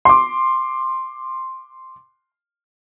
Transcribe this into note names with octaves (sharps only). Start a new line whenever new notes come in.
C6 D6